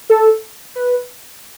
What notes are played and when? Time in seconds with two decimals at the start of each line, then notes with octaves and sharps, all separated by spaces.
0.10 A4
0.76 B4